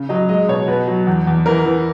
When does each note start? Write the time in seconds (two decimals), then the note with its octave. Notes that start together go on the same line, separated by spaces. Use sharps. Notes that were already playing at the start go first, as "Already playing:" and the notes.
Already playing: C#3
0.09 F#3 D#5
0.29 G#3 D#5
0.48 B2 C#5
0.68 B2 B4
0.88 F#3
1.07 E2
1.27 E2
1.46 E3 A#4
1.65 E3